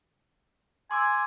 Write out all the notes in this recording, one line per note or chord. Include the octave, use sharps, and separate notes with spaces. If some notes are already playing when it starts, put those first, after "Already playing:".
G#5 C6 D6 E6